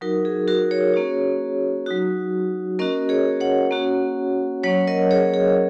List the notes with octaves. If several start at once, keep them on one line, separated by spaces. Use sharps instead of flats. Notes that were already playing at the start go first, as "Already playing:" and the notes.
F#3 D#4 F#4 A#4
G#4
F#4 A#4
G#4 C#5
A#3 C#4 F#4
F#3 D#4 F#4
A#3 C#4 F#4 A#4 D#5
G#4 C#5
C#5 F#5
A#3 C#4 F#4
F#3 A#3 C#4 C#5 F#5
A#4 D#5
G#4 C#5
G#4